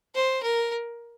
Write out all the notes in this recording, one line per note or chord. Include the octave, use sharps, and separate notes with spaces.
C5
A#4